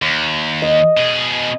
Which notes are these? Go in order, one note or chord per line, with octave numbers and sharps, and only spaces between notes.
D#2
D#5
B2 G#4